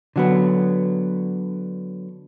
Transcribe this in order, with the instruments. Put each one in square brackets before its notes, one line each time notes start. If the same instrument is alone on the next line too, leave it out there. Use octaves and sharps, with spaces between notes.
[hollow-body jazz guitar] D3 F#3 B3